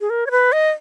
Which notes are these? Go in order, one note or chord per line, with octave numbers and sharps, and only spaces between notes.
G#4
A#4
C#5
B4
D#5